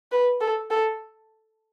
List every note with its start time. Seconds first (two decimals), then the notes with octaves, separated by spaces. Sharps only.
0.12 B4
0.41 A4
0.71 A4